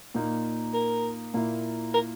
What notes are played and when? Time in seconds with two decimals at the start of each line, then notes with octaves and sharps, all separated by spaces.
0.14 A#2 A#3 D#4
0.73 A#4
1.34 A#2 A#3 E4
1.94 A#4